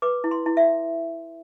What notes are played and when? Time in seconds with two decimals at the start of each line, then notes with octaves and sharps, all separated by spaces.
0.02 B4 D6
0.24 E4
0.31 C6
0.46 E4
0.57 E5